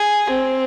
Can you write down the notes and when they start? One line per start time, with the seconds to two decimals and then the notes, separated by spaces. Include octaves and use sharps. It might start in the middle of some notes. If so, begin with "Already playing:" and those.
Already playing: G#4
0.29 C4